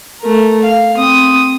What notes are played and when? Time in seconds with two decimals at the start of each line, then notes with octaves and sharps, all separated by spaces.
0.21 A3 A#4
0.63 F5
0.95 C4 D#6